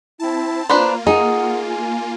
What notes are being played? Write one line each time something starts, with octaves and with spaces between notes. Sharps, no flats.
C4 E4 A5
A#3 D4 F4 B4 C5 A#5
D#4 G#4 F#5
G#5